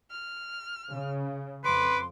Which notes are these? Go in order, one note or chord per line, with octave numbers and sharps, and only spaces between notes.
F6
C#3
F2 B4 C6 D6